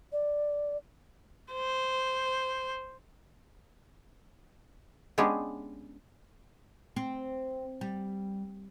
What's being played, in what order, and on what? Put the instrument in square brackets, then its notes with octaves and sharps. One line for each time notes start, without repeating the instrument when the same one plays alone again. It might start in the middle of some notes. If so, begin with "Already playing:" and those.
[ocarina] D5
[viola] C5
[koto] G#3 B3 C#4 D4 G4 G#4
[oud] C4
G3